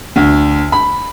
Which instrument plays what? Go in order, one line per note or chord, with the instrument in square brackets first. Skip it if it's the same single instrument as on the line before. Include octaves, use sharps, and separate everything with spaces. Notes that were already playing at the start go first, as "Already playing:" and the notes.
[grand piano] D2
B5